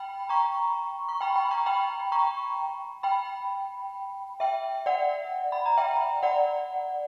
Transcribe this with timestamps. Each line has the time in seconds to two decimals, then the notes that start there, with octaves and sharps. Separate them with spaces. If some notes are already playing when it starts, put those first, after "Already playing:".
Already playing: G5 B5
0.29 A#5 C#6
1.09 C#6
1.21 G5 B5
1.36 G5 B5
1.51 A#5 C#6
1.66 G5 B5
2.12 A#5 C#6
3.03 G5 B5
4.40 E5 G5
4.86 D5 F#5
5.52 B5
5.66 A#5
5.77 E5 G5
6.23 D5 F#5